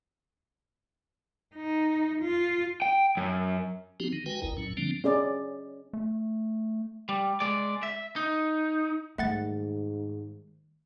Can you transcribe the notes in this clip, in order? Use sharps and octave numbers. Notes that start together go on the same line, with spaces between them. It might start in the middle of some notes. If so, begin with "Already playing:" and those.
D#4
F4
G5
F#2
F3 B3 C4 D#4 F#4 G4
D#3
G#3 F#4 B4 G5 G#5
G1 D#2 E4 A#4
A2 F#3 C#4
D3 F3 G3 A#3 C4 D4
C#4 G#4 D5
A3
G3
G#3 D5
E5
D#4
G#2 D#3 G3 A3 F#5 A6